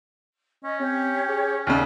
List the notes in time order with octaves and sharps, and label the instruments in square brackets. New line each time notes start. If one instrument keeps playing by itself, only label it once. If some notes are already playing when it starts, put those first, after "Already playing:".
[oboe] C#4 [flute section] D#5
[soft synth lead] C4 [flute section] G4 C#5
[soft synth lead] G#4
[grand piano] D#2 C#3 [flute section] D5 E5 [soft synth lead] F6